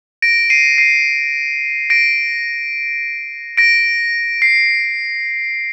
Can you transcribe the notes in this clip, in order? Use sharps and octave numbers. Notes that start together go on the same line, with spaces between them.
A#6 D7
C7 D#7
C7 D#7
A#6 D7
A#6 D7
C7